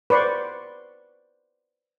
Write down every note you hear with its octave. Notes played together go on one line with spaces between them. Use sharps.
B4 C5 D5 C6 C#6